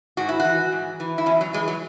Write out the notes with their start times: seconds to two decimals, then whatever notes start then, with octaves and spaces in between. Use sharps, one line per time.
0.17 G#2 F#4
0.29 E4
0.40 F#4
0.45 E3
0.72 G#2
1.00 E3
1.18 E4
1.26 E2 C#4
1.41 F#3
1.53 E3 G#3
1.68 F#3